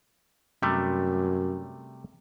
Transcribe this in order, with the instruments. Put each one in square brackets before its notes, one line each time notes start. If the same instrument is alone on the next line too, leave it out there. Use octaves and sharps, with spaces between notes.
[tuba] F#2 [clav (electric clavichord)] C3 G3 A3